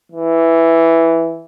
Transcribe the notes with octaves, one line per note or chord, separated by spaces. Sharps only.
E3